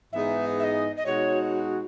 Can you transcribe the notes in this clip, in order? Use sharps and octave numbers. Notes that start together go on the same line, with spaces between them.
G#2 E3 B3 D#4 G#4 E5
E5
D#5
D#5
B2 G#3 D#4 F#4 C#5